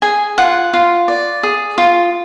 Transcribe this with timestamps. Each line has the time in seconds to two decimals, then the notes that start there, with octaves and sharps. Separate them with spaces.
0.02 G#4 G#5
0.38 F4 F#5
0.74 F4
1.08 D5
1.43 G#4
1.78 F4